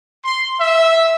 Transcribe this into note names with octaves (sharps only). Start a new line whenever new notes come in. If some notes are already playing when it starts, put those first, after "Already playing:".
C6
E5